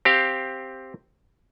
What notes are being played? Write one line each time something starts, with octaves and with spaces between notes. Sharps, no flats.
C4 G4 F5